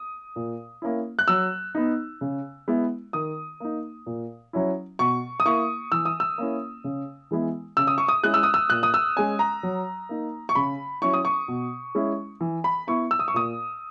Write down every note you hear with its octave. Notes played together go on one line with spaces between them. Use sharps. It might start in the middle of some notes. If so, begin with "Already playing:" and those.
Already playing: D#6
A#2
A#3 C#4 E4
F#6
F#3 E6
B3 D#4
C#3
G#3 B3 E4
D#3 D#6
A#3 D#4
A#2
F#3 C#4 E4
B2 C#6
D#6
A#3 E4 C#6
E3 E6
D#6
E6
A#3 C#4 E4
C#3
E3 G#3 B3 E4
C#3 E6
D#6
C#6
D#6
G#3 C#4 E4 F#6
E6
D#6
E6
A#2 F#6
D#6
E6
G#3 C#4 G#5
A#5
F#3
A#3 D#4
C#6
C#3 B5
F#3 C#4 E4 C#6
D#6
C#6
B2
G#3 C#4 E4
E3
B5
B3 E4 C#6
E6
D#6
C#6
A#2 D#6